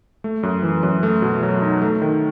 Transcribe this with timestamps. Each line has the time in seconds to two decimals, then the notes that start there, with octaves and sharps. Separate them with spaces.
0.24 A3
0.43 F#2
0.63 E3
0.83 F#2
1.03 A3
1.22 B2
1.43 F#3
1.62 D#4
1.82 A3
2.02 D#3